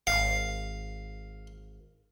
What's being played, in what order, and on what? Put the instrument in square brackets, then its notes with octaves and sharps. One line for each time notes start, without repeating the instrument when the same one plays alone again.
[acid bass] G#1 [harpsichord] F5